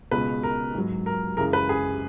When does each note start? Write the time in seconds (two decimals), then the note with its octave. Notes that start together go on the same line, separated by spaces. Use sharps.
0.11 C#2 B2 G#3 B4
0.43 A#4
0.74 G#2 F#3
1.06 A#4
1.37 F#2 C#3 E3 G#3 A#4
1.53 B4
1.69 G#4